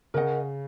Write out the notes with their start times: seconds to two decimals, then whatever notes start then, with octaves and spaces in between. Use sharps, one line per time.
0.14 C#3 A#4 D#5 F#5